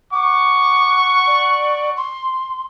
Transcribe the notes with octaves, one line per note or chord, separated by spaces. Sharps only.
F#5 C#6 D6
D5
C6